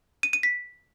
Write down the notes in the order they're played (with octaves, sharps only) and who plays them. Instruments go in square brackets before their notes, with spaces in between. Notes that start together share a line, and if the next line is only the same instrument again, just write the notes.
[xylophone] D#7
D#7
B6